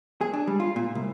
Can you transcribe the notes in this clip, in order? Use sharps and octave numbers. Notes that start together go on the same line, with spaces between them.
G#4
D4
G3
F4
A#2
C2